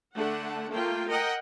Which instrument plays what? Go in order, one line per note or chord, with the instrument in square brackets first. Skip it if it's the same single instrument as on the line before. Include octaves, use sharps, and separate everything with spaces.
[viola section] D3 A3 D4 F#5
A3 A#3 F4 G5
A#4 D#5 F#5 G5